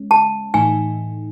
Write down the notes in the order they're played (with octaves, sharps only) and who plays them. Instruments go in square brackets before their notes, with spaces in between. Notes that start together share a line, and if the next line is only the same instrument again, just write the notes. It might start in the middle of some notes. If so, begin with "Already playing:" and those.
Already playing: [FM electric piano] G#3 C#4
[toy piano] A5
[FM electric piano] A2 E3 A3 D#4 [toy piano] G#5